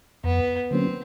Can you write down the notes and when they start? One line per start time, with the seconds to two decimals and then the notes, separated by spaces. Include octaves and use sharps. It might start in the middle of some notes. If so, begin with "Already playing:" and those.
0.24 F2 B3
0.71 D3 F#3 A#3 C4 C#4